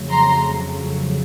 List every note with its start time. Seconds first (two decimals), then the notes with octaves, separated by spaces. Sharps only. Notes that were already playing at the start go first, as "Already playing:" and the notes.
Already playing: F2 C#3 F#3 A3
0.10 A#5 C6